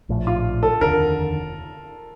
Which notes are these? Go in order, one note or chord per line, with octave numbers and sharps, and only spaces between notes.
A#1 A2 F3
F4
A4
F1 D#2 D3 A#4